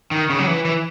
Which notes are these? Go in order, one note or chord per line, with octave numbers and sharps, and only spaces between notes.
D#3
C#3
F#3
E3
E3